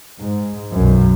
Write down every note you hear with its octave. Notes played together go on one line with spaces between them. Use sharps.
G#2
B1 F#2